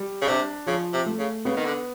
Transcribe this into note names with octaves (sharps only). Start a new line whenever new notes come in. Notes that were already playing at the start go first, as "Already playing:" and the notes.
Already playing: G3
C#3
C3 D4
C#3 F3
C3
A3
C#3
C#3 B3
D#3
D3